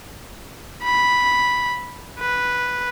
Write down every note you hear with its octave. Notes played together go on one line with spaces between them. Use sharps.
B5
B4